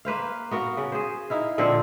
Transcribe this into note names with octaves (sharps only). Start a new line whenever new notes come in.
A#3 B4 C5 F5
B3 F#4 A#4 F5
C#3
G#4 C5
D#4 E4 F5
A#2 D3 F3 C4